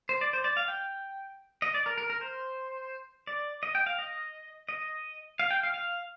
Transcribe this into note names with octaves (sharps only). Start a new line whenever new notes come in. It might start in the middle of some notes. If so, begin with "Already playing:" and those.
C5
D5
C5
D5
F5
G5
D#5
D5
A#4
A#4
A#4
C5
D5
D#5
G5
F5
D#5
D#5
F5
G5
F5
F5